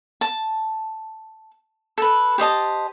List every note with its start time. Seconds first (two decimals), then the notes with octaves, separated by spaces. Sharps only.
0.21 A5
1.98 A4 B4
2.38 G4 C5 D#5 A5